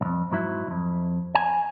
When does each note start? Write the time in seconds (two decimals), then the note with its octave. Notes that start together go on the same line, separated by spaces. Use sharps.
0.01 B1 F2
0.31 G#2 F#3 E4
0.67 C2 F2
1.35 G#5